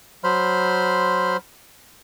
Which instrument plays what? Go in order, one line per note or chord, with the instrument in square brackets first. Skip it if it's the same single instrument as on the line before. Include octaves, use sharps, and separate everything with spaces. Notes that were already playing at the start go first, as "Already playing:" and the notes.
[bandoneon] F#3 C5 B5 C6 F6